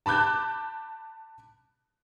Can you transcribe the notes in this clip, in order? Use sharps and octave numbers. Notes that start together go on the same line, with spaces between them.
A5 B5 D6 F#6 G6